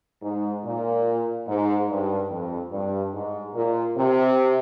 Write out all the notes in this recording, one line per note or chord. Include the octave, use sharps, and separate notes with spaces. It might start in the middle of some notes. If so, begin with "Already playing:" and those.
G#2
A#2
G#2
G2
F2
G2
G#2
A#2
C3